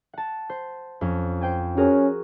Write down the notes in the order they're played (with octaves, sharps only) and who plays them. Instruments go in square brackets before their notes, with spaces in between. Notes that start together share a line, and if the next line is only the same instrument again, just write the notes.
[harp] F#5 A5
C5
F2 C#4
C5 G5 G#5
[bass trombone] C#4 [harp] F#4 G#4 A#4